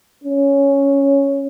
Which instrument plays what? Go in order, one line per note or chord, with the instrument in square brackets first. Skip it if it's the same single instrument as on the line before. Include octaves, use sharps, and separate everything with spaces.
[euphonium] C#4